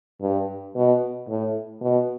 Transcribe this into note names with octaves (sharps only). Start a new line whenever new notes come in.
G2
B2
A2
B2